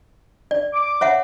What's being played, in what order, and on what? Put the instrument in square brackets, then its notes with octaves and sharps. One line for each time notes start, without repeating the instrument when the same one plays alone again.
[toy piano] D5
[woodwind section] D6
[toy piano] C#5 E5 F#5